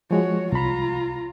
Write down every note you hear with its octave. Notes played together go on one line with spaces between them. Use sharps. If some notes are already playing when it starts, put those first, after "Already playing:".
F3 G#3 F#4 C#5
C2 F4 A#5 B5